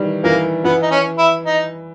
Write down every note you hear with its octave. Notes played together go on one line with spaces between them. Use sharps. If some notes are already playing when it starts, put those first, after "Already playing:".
Already playing: D#3 E3 G3
E3 A#3
E3 B3
D#4
C#4
E4
D#4